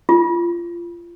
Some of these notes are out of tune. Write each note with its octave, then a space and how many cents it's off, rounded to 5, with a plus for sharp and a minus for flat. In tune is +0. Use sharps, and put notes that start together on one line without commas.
F4 -25